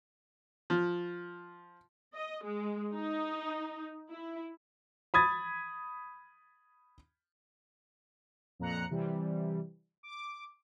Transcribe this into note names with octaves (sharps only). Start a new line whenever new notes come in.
F3
D#5
G#3
D#4
E4
B5 D#6 G#6 A6
F2 A#2 A#5 F#6 C#7
C3 E3 G3
D6